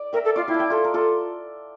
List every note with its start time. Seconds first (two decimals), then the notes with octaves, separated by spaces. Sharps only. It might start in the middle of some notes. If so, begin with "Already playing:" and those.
Already playing: D5
0.13 A#4 E5 G5
0.25 A4
0.36 F4 D5 F5
0.47 E4 E5 G5
0.54 A5
0.59 E5 G5
0.70 F4 A4
0.84 A#4
0.94 F4 A4